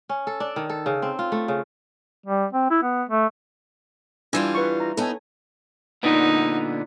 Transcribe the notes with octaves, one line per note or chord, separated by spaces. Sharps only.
C#4
A4
D4
D#3
A4
C#3
C4
F4
A3
C#3
G3
C4
E4
B3
A3
E3 G3 D4 F4 G#5 E6
B4 C#6
A#5
B3 D#4 A4 C#5 G#5
A#2 D3 B3 D#4